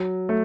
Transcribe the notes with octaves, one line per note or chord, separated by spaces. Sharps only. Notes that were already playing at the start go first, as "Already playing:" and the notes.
Already playing: F#3
A3